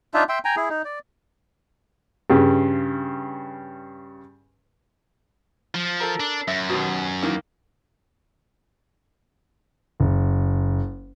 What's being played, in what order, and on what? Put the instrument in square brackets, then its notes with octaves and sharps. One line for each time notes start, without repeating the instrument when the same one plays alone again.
[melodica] D4 D#4 F4 E5
E5 G5 C6
G5 G#5 A#5
E4 G#4
D#4
D5
[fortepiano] G2 C#3
[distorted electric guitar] F3
[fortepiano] A4 A#4
[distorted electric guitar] D4
[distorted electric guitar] F#2 [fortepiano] E5
[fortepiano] D#2 B2
D#3 E3 A#3
[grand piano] F#1